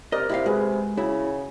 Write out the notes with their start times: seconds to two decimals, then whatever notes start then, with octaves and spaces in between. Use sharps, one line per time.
0.12 C3 A#4 D5 D#5
0.29 C3 E4 G4 F5
0.46 G#3 F#4 G#4 B4
0.98 C#3 E4 F#4